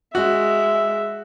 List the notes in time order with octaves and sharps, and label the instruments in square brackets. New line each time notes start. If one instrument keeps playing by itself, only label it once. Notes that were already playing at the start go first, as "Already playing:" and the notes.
[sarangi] G#3 [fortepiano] F#4 [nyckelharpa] E5